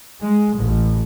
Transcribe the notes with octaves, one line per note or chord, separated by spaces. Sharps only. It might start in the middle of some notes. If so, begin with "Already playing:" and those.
G#3
A1